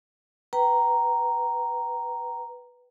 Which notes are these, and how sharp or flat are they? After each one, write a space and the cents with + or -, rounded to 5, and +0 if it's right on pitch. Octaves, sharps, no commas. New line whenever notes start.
B4 +0 G5 -35 A#5 +0